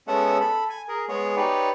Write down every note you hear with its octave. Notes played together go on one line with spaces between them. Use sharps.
G#3 B3 C#4 A4 E5 F#5
A4 B5
G#5
G#4 A#4
G#3 B3 G#4 C#5
D#4 G4 B4 C#5 D5